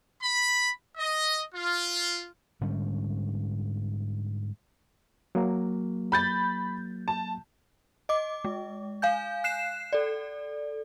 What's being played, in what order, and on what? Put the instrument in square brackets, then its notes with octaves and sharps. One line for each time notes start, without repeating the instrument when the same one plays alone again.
[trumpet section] B5
D#5
F4
[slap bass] G#2 D3 G3 C#4
[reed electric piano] F#3 A#3
[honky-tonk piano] B5 G6 A6
A5
[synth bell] D#5 D6
G#3
F5 G#5 G6
F#6 C7 E7
A4 D5